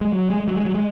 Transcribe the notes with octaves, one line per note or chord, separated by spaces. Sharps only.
G#3
F#3
G#3
G#3
F#3
G#3
F#3
G#3